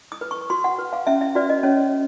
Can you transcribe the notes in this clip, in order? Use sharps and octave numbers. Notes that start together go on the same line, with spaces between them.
D#6
B4
C#6
F#4 C6
F#5
B4
F5
C#4 E5
E5
F#4 B4 D5
D#5
C#4 C#5